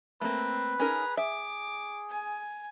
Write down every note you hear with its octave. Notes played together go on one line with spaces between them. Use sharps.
A3 A#3 C4 B4
C#4 D#4 G#4 A#4 A#5
G#4 E5 D6
G#5